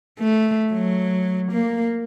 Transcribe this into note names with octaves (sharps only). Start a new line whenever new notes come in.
A3
F#3
A#3